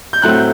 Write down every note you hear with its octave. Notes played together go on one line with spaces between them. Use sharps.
G6
A2 F#3 A3 C4 F#6